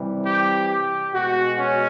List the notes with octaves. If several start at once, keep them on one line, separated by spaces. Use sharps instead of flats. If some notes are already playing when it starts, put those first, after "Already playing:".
Already playing: C3 E3 G3
G4
G4
B2 G#3 F#4
C#4